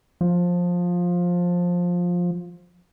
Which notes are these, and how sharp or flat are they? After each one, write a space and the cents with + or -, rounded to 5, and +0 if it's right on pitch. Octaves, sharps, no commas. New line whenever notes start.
F3 +15